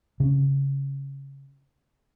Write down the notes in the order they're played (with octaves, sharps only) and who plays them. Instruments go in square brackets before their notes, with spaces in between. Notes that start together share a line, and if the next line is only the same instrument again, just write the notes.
[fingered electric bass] C#3 C#4